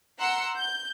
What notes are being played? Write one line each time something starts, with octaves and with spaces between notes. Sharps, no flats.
F#5 A#5 C6 E6 C#7
G6